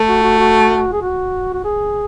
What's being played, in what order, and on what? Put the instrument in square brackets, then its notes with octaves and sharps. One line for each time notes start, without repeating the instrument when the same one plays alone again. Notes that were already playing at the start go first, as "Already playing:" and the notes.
Already playing: [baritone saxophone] A3
[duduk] F#4
F#4
F#4
G#4
F#4
F#4
G#4